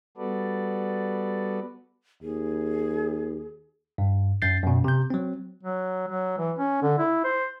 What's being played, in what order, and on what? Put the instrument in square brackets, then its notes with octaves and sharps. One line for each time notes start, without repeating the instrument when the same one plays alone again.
[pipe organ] G3 B3 F#4 A4 B4 D5
[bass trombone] D#2 [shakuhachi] G#4
[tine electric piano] G2
F#2 G6 A6 C7
F#2 B2
C3 G6
F#3 C4
[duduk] F#3
F#3
E3
C#4
D3
E4
C5